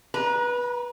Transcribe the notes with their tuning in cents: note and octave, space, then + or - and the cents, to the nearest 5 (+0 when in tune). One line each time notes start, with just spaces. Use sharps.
B4 -20 A#5 +25